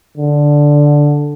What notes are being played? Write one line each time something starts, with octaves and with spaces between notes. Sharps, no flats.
D3